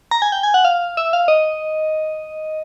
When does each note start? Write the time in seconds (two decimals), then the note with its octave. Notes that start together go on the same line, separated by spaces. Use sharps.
0.11 A#5
0.22 G#5
0.32 G5
0.43 G#5
0.54 F#5
0.65 F5
0.97 E5
1.13 F5
1.28 D#5